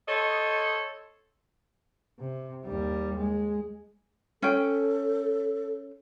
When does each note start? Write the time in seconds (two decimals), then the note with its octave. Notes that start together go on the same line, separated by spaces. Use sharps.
0.08 A4 C5 C#5 D#5
2.19 C3
2.66 D#2 G3
3.18 G#3
4.42 C#4 A4 G5